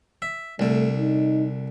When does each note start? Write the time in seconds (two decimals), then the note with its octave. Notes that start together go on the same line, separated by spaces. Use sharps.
0.22 E5
0.59 C2 D3 A3
0.99 D#4